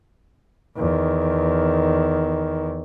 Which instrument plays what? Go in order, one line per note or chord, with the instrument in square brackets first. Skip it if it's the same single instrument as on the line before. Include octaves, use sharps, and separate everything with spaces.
[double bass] E2 D#3